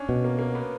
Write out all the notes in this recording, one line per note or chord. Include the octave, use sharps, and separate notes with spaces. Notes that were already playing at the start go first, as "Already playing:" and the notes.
Already playing: C#4 D4
B2
A#3
A#3
B3